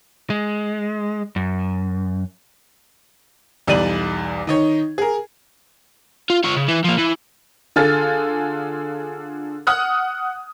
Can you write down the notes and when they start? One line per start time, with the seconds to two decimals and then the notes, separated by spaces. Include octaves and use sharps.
0.30 G#3
1.36 F#2
3.67 B1 E2 G3 D5 D#7 F#7
4.47 D#3 D#4 C#5
4.98 G#4 A#4
6.30 F4
6.44 F4 C#5
6.56 C#3
6.68 E3
6.84 F3 A#3
6.98 E3
7.76 D3 F4 G#4 A4 F6 A6
9.67 F#5 D#6 F6 F#6